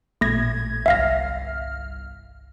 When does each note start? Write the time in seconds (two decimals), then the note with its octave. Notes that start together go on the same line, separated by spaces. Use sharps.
0.21 A1 A#2 A3 G#6 A#6
0.86 G1 C2 E5 F5 F6 A#6